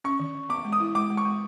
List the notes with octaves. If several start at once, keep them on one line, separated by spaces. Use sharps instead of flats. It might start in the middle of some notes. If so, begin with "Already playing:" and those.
C#4 C#6
D#3
D#3
B3 D6
G#3
D#6
E4
G#3 D6
G#3
C#6
G#3